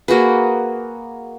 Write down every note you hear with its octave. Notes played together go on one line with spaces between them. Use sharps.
A#3 F#4 G#4 B4